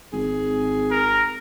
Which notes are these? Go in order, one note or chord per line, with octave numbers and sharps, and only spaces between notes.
G#1 G#4
A#4